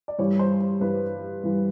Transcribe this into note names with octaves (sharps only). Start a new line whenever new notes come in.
D5
G2 E3 G3 C#5
C5
C5
G2 E3 G3 B4
G2 E3 G3